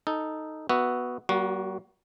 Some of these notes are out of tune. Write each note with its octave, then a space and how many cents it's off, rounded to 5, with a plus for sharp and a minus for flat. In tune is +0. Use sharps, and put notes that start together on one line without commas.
D#4 +0 A4 +0
B3 +0 F#4 +0 E5 +0
G3 -45 A#3 +25 F#4 -5